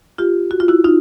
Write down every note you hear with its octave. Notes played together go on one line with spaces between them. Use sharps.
F4 G4
F#4
F4
E4 F#4
D#4 F4